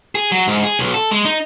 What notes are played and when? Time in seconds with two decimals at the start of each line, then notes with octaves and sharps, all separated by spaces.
0.15 G#4
0.32 F#3
0.48 G#2
0.64 G#4
0.79 B1
0.94 A4
1.11 G#3
1.25 D#4